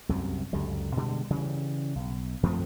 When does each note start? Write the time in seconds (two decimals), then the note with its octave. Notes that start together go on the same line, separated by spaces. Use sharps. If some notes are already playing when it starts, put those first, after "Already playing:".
0.09 C2 F#2 C3
0.53 C#2 F#2 D3 G3
0.97 B2 D3 G3 G#3
1.30 C#3 E3 G3
1.95 B1
2.43 F#2 F3 A3 C4